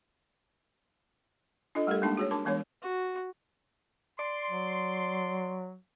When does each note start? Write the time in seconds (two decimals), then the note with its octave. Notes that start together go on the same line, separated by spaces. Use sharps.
1.75 D4 F4 A4 D#5
1.87 G3 A3 G4 A4 A#4
2.02 G#3 A#3 D4 D#4 A5
2.17 F#4 G#4 C#5
2.31 D4 A#4 A5 D6
2.45 E3 G#3 B3 D4 A#4 C#5
2.83 F#4
4.19 D5 C6
4.50 F#3